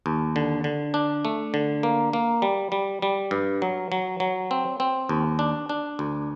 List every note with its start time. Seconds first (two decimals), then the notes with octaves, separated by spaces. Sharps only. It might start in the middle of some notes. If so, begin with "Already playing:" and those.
0.06 D#2
0.36 D3
0.64 D3
0.94 D4
1.25 A3
1.54 D3
1.83 A#3
2.13 A#3
2.42 G3
2.72 G3
3.02 G3
3.31 G2
3.62 F#3
3.92 F#3
4.20 F#3
4.51 C4
4.80 C4
5.09 D#2
5.39 D4
5.69 D4
5.99 D2